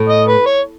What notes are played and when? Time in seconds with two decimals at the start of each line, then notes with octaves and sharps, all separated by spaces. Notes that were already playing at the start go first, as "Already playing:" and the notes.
Already playing: A2
0.09 D#5
0.28 B4
0.46 C#5